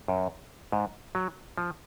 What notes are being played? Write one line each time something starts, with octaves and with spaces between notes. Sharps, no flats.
F#2
G#2
F#3
F3